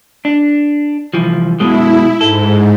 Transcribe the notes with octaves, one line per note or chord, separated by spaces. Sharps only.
D4
C2 E3 F3
F#2 B2 G#3 E4
G#2 A4